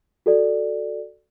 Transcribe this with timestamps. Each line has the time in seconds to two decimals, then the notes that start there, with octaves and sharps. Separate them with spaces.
0.26 F#4 A4 D5